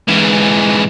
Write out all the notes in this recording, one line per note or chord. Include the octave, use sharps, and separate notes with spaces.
G#2 E3